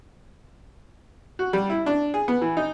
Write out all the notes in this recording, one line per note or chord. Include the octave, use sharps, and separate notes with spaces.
F#4
G3
E4
D4
G#4
B3
E3
D#4